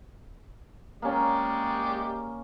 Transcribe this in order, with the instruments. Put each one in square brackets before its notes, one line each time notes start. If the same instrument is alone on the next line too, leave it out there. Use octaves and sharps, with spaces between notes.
[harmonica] G#3 G4 D5 [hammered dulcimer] A#3 C#4